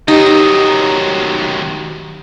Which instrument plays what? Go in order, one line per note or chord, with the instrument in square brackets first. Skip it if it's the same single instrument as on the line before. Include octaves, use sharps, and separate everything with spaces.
[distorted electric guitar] D#3 F#3 [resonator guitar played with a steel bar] D#4 [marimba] G4